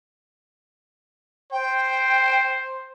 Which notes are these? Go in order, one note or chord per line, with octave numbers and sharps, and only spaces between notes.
C5 G5